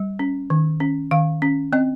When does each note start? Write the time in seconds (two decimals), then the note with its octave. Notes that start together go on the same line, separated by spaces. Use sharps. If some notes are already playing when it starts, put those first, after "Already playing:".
Already playing: G3
0.19 C#4
0.50 D#3
0.80 C#4
1.11 D#3 F5
1.42 C#4
1.73 C4 D#5